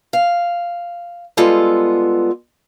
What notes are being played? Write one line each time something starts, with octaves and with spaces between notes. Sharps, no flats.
F5
G3 G#3 B3 F4 A4